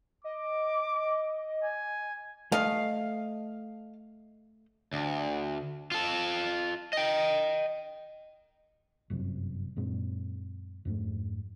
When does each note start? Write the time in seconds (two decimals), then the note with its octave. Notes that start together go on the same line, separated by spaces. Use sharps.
0.24 D#5 D6
1.64 G#5
2.52 A3 D#5 F5
4.93 D2
5.91 F4 A4
6.93 D#5 G5
9.10 G1 F#2 C3
9.76 F#2 A#2 G#3 C4
10.85 F2 G#2 A3